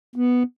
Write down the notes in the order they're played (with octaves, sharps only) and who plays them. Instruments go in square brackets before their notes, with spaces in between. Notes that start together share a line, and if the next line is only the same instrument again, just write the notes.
[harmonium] B3